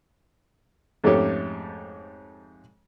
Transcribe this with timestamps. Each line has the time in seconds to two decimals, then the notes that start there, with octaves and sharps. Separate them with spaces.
1.04 F2 G#2 A3 C#4 G4 C#5